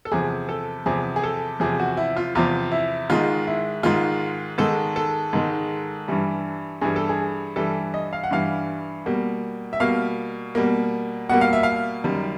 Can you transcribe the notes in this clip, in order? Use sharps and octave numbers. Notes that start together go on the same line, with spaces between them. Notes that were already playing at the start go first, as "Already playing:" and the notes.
A4
E2 C3 F3 G#4
A4
E2 C3 F3 G#4
G#4
A4
E2 C3 F3 G#4
F#4
E4
F4
E2 C3 F3 F4
E4
G#2 D#3 G#3 F4
E4
G#2 D#3 G#3 F4
G#2 D#3 G#3 A4
A4
G#2 D#3 G#3
G2 E3 G3
G2 E3 G3 G#4
A4
G#4
G2 E3 G3 A4
D#5
F5
F#5
G2 E3 G3 F5
B2 G3 A#3
E5
B2 G3 A#3 F5
B2 G3 A#3
B2 G3 A#3 F#5
F5
E5
F5
F#2 D#3 G3